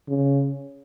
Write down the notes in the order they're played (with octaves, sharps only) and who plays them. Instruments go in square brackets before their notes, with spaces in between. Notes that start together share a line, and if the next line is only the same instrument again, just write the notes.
[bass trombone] C#3